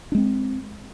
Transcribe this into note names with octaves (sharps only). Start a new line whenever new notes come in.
G#3 C4 D4